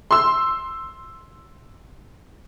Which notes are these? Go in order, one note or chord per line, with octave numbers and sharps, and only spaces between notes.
C6 E6